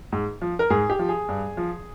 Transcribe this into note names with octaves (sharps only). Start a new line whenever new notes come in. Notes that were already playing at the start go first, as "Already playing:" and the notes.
G#2
F3
A#4
G#2 G#4
G4
F3
G#4
G2
F3